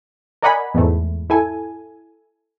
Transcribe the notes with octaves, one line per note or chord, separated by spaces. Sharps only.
A#4 D5 D#5 F#5 G#5 B5
E2 G#2 A3
E4 A4 G#5